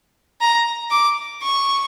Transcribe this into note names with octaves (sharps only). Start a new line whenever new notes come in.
A#5
D6
C#6